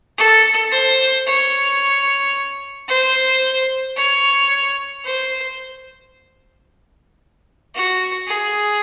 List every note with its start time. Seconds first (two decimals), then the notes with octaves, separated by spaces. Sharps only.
0.18 A4
0.71 C5
1.25 C#5
2.88 C5
3.96 C#5
5.04 C5
7.75 F#4
8.28 G#4